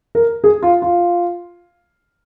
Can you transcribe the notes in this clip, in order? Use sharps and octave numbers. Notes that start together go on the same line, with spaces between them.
A#4
G#4
F4
F4